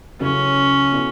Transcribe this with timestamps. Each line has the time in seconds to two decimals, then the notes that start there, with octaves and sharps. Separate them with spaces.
0.20 C#2 C#3 F#3 A3 C#4 E4
0.92 B2 A3 E4